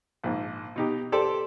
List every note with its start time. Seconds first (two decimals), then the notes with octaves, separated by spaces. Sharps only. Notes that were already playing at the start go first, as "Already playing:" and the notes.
0.24 A#1 G#2
0.76 B2 D#4 G4
1.12 G4 A4 C5 D5